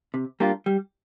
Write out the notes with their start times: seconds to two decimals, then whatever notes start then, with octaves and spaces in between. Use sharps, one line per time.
0.14 C3
0.40 G3 A#3 D4 F4
0.66 G3